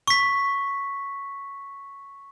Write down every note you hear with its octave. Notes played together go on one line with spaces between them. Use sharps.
C#6 B6